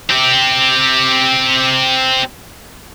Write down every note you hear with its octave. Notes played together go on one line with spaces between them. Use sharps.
C4 G4